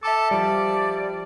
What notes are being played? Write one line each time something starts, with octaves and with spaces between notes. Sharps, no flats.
A4 E5 A5 D6
F3 G3 D5